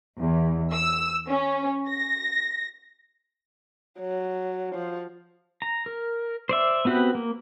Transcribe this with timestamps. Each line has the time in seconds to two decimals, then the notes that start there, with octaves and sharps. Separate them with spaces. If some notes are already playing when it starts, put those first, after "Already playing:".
0.20 E2
0.72 E6
1.28 C#4
1.89 A#6
3.99 F#3
4.75 F3
5.62 A#5
5.86 A#4
6.49 C5 D5 E5
6.85 B3 C4 F#4 G4 B4
7.15 A#3